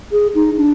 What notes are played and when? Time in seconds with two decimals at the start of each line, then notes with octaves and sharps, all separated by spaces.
0.12 G#4
0.35 D#4
0.57 D4